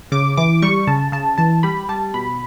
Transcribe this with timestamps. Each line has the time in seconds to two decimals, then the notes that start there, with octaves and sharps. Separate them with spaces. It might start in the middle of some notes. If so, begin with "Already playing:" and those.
0.12 C#3 D6
0.37 E3 D6
0.62 G3 C#6
0.87 C#3 A5
1.12 C#3 A5
1.38 E3 A5
1.63 G3 B5
1.89 G3 A5
2.14 B2 B5